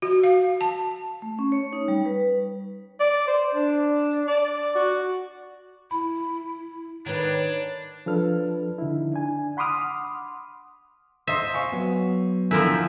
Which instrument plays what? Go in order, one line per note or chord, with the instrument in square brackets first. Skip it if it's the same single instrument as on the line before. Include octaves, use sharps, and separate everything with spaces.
[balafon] F#4
F5
A5
[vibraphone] A3
C#4
C#5
D#4
G3
B4
[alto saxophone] D5
C5
D4
D5
F#4
[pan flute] E4 [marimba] B5
[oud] D#3 B4 [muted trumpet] D4 [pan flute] C#5
[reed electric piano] F3 D4 A4 B4 F6
D3 D#4 E4
D4 G#5
F#5 B5 C6 D6 D#6 F6
[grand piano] C5 D#5 C6 [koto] E5
[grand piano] F5 G#5 C#6
[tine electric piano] F#3 B3
[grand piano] D3 A#4 G#5 [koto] F3 E4